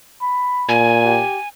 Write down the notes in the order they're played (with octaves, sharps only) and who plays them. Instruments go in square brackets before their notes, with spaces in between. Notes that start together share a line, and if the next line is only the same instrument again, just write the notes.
[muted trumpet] B5
[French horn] A#2 [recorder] G#5
[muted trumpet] G4